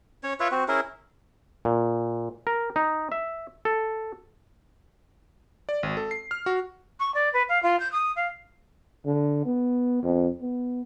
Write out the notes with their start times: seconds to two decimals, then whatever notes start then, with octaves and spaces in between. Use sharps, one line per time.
0.23 C#4 C#5
0.40 F4 B4 C#5 E5
0.52 C4 F#4
0.68 C#4 E4 G#4 A#4
1.65 A#2
2.47 A#4
2.76 D#4
3.12 E5
3.65 A4
5.69 D5
5.83 G#1
5.97 A4
6.11 C7
6.31 F6
6.46 F#4
7.00 C#6
7.14 D5
7.33 B4
7.49 F5
7.63 F4
7.80 G6
7.92 D#6
8.16 F5
9.06 D3
9.46 B3
10.03 F2
10.42 B3